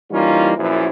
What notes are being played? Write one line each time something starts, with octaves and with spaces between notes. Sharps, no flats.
E3 G3 A#3 C#4 D#4 F4
A#1 F#2 E3